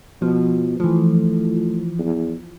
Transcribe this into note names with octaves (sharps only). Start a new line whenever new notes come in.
B2 F3
E3 F3 A3
E2